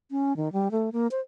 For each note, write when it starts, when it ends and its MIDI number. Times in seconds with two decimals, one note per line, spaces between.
0.11 0.36 61
0.37 0.52 51
0.52 0.69 55
0.71 0.90 57
0.92 1.07 58
1.11 1.20 72